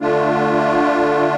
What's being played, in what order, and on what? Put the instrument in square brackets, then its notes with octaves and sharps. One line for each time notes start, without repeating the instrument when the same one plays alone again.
[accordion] D3 A3 D4 F4